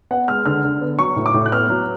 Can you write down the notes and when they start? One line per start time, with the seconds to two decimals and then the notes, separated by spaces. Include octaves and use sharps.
0.11 B3 F#5
0.28 G#3 F6
0.46 D3 F6
0.64 D3
0.81 B3
0.99 F#3 C#6
1.16 A2
1.26 D6
1.34 A2
1.46 F#6
1.52 B3 F6
1.70 F#3